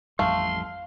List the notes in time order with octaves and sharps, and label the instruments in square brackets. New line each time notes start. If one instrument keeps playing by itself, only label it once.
[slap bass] A1 F2 G3 [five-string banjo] A3 [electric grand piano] F5 [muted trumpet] C6